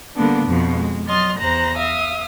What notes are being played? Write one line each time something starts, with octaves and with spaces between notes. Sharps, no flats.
D3 G3 A#3 B3 D4
F2 B2 F3
G#3
F#3 D#5 C6 F6 A6
E2 C5 A#5 F#6 A#6
E5 F5 D#6